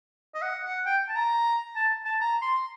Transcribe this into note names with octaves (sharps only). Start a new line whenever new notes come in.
D#5
F#5
F#5
G5
A5
A#5
A5
A5
A#5
C6